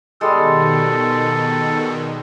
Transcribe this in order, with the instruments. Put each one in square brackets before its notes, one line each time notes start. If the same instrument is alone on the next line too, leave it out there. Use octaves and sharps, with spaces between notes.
[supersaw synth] B2 D#3 [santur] G3 G#3 [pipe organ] A4